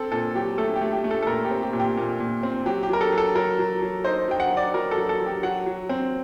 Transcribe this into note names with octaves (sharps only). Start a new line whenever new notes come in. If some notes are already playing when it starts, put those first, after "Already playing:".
Already playing: C4 A4
A#2 A4
F#3 G4
A3 A4
G4
A3
G4
A3
A4
A4
A#2 A#4
G4
C4
G4
A#2
G4
A#2
A#2
C4
F#3 G4
G4
F#3 A#4
A4
F#3
A4
F#3 A#4
F#3
F#3
D#4 C5
F#3 G5
F#5
F#3
D5
F#3 A#4
A4
F#3
A4
F#3
G4
F#3 F#5
F#3
C4